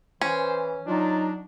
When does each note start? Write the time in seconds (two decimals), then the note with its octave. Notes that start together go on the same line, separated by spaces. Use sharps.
0.21 E3 C#4 C5
0.87 F#3 D4 D#4 F4